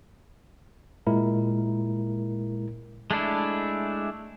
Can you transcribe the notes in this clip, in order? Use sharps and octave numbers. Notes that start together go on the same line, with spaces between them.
A#2 G#3 E4 A#4
G#3 A3 D4 E4